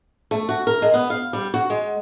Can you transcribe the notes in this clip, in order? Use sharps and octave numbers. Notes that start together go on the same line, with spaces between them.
A3
F#4
A#4
G#3
B3
F5
G3
F#4
G#3